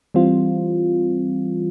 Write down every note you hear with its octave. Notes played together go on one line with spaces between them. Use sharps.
E3 G3 C4 F4